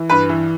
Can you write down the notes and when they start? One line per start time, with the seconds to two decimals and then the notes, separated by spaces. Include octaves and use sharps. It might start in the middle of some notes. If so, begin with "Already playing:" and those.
Already playing: E3
0.09 G2 B4
0.29 E3